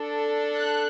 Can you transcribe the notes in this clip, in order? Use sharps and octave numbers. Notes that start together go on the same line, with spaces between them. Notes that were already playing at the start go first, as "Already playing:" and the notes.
Already playing: D4 A4
F#6